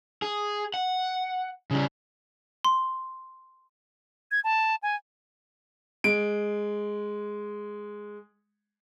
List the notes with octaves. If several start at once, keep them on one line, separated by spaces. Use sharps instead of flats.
G#4
F#5
C#3 G3
C6
G#6
A5
G#5
G#3 D7